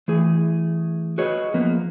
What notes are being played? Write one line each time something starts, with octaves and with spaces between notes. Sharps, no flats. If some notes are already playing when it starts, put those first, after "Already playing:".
E3 A3 G#4
F#4 G#4 B4 C#5 D#5
F3 A#3 B3